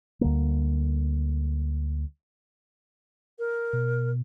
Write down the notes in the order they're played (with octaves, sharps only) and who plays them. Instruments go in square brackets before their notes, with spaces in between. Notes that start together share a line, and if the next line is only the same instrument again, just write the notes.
[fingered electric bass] D2 D3 G3 A#3
[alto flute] A#4
[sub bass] B2